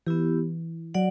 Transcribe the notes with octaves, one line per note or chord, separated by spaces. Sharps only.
E3 B3 E4 G4
F#3 D5 F#5